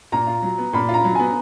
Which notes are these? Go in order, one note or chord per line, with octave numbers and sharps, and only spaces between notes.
A#2 A#5
F4
F#3
B3
A#2 B5
F4
A#5
F#3
B3 G#5